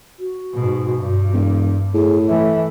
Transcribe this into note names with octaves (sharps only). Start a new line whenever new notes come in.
F#4
G#2 B2
G2
E1
A2 G#4
E3 A3 E5